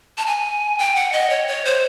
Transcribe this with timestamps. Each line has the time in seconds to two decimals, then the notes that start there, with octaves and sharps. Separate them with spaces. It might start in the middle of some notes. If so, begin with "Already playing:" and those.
0.18 A5
0.27 G#5
0.78 G5
0.95 F#5
1.12 D#5
1.30 C#5
1.48 C#5
1.65 C5